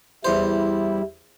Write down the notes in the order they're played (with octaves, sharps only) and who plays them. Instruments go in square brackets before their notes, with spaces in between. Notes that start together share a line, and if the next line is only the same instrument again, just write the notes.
[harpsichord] E2 C5 [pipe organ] G3 E4